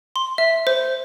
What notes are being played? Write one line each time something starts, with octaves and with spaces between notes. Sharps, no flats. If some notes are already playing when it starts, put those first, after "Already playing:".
C6
E5
C5